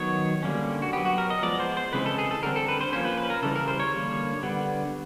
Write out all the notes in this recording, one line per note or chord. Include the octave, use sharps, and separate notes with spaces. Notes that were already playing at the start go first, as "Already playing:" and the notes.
Already playing: D#3 F#3 B3 C#5
D3 G3 A#3 C#4
F#4
F#3 B3 G4
F#4
A#4
D#5
F3 G#3 B3 D5
C5
C5
C#3 E3 G#3 C4 B4
A4
G#4
A4
D3 G3 C4 A#4
A4
B4
C5
F3 A#3 C#4 C5
B4
B4
A#4
C#3 E3 G3 A4
A#4
C5
C#5
D3 G3 A#3
D3 G3 B3